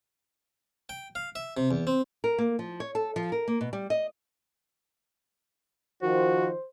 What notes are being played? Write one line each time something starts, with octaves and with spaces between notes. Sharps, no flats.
G5
F5
E5
C3
E2
C4
A#4
A#3
F3
C#5
A4
F3
A#4
A#3
B2
G3
D#5
D#3 F3 F#4 C5